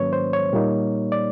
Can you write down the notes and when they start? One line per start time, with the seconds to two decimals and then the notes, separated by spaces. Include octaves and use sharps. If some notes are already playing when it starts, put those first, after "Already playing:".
Already playing: G#2 D#3 F#3 A#3 C#4 B4 C#5
0.13 C5
0.33 C#5
0.53 A#2 G3 A#3 D#4
1.12 D5